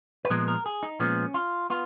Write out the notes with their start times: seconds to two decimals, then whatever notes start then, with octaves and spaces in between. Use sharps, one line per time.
0.25 B4
0.30 A#2 F3 G#3 B3 A#4
0.48 A#4
0.66 G#4
0.83 D#4
1.00 A#2 F3 G#3 B3 C#4
1.34 F4
1.70 B3 F4